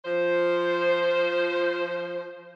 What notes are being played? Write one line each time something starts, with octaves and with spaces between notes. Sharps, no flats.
F3 C5